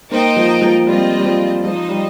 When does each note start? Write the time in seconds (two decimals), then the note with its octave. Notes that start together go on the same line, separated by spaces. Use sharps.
0.11 A#3 D#4 C5 D#5 G5
0.36 F3
0.61 F3
0.87 G3 C4 F4 D#5
1.18 G3
1.25 F3
1.63 F3 D#4 C5 D#5
1.89 G3